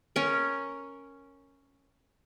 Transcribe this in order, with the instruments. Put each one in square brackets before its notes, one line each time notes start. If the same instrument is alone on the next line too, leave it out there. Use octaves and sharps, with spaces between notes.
[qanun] C#4 A#4